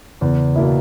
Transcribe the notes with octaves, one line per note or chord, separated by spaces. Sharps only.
E2 C#3
B2 A#3 E4